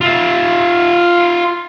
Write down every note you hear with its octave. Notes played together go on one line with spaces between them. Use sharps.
F4 E5